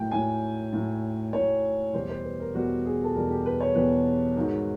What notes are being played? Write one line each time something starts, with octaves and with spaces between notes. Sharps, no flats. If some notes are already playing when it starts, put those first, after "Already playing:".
Already playing: A2 F#3 G5
A2 F#3 G#5
A2 F#3
A2 F#3 C#5
E2 B2 G3 C5
C5
B4
A#4
E2 B2 G3 F#4
G#4
A4
E2 B2 G3 A#4
G4
B4
C#5
E2 B2 G3 B4
G#2 D#3 F#3